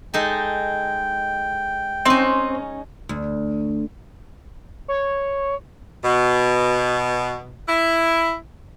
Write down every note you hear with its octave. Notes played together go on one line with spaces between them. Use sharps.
G#3 D#4 A4 G5
C4 C#4 D#4
D2
C#5
B2
E4